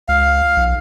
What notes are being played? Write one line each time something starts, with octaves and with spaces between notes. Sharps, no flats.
C#2 F5
B1